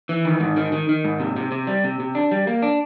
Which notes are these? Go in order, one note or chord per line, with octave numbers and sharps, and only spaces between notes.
E3
D#3
G#2
D#3
D#3
D#3
G#2
C3
C3
C3
G3
C3
C3
D4
G3
A#3
D4